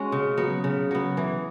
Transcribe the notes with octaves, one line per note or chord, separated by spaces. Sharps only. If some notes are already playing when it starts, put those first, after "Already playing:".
Already playing: G#3 C#4 F#4
C#3
F#3 B3
C#3
F#3 B3
E3